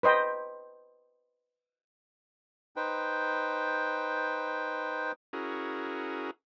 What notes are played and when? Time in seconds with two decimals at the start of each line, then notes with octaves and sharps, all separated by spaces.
0.03 B4 C5 D#5 G5
2.76 D#4 B4 C5 G5
5.33 C#4 E4 F#4 G#4 A#4